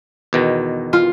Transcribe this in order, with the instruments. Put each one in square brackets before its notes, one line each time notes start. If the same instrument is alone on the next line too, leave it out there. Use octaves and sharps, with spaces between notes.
[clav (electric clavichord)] E2 B2 D#3
[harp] F4